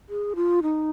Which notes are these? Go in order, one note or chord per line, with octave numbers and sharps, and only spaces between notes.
G#4
F4
D#4